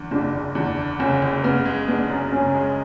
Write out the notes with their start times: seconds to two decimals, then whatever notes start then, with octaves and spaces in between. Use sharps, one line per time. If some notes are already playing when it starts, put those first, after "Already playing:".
Already playing: E2 D3
0.11 F#1 D4
0.33 F#1
0.55 E2 D4
0.78 D3
0.99 F#1 C#4
1.22 F#1
1.44 C#3 B3
1.66 G#3
1.88 B3 D4
2.10 F#2
2.32 C#3 C#4
2.54 G#3